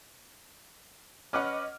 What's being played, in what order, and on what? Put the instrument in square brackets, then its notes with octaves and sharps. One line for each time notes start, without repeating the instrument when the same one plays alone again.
[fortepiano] C#4 B4 F#5 [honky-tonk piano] D#5 D6 F6